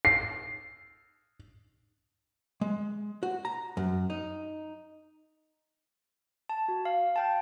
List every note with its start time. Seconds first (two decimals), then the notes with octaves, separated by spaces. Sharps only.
0.05 C7
2.61 G#3
3.23 F#4
3.45 A#5
3.77 F#2
4.10 D#4
6.49 A5
6.68 F#4
6.85 F5
7.16 F5 G5 A5